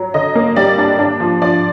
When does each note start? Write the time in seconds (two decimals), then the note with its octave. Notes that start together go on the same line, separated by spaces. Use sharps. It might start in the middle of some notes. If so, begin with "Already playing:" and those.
Already playing: F#3
0.14 D3 D#5
0.35 A#3
0.56 G3 D5
0.78 D4
0.99 D4
1.20 F3
1.42 F3 D5